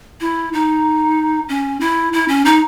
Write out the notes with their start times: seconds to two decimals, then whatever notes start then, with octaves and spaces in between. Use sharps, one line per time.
0.20 E4
0.53 D#4
1.49 C#4
1.80 E4
2.13 E4
2.28 C#4
2.45 D#4